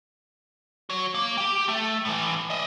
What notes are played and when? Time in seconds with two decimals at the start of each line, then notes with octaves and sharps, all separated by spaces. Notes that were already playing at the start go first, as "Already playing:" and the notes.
0.90 F#4 C#5
1.15 A#3
1.37 G4 G5
1.69 A3
2.05 A2 E3
2.50 D#5 E5